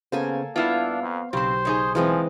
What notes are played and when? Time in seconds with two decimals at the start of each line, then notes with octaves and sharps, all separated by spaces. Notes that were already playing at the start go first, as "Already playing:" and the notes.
0.12 C#3 A#3 B3 A4 C5 G#5
0.56 G2 B3 D4 E4 F4 F5
1.02 F2
1.33 B1 C#3 C4 G4 C5
1.65 C#3 D#4 G#4 C#5
1.95 E3 F3 G#3 C4